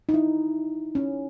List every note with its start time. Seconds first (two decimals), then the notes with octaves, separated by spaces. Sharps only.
0.09 D#4
0.14 E4
0.95 C#4